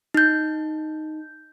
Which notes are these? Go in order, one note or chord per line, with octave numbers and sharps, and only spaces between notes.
D#4 G6